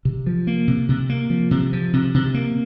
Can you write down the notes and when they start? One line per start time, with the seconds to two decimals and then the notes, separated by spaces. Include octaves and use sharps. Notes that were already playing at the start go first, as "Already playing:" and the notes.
0.05 C3
0.27 F3
0.47 A#3
0.68 C3
0.89 C3
1.09 A#3
1.30 F3
1.51 C3
1.73 F3
1.93 C3
2.14 C3
2.34 A#3